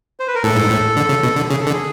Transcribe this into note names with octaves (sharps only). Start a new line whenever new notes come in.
C5
B4
A#4
A2 A4
G#2
A2
D3
C#3
B2
D3
C#3 G#4
A4
D3
G#4